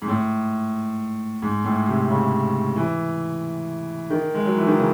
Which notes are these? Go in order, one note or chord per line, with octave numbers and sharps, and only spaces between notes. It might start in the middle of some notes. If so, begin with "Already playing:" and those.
G#2
A2
G#2
A2
C3
C#3
E3
D#3
G#3
F#3
E3
D#3
C#3